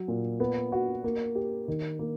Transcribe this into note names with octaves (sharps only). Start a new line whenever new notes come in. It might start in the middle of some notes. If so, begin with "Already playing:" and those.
Already playing: F#3
A#2
B3
F#4
A#3
G4
D#3
A#3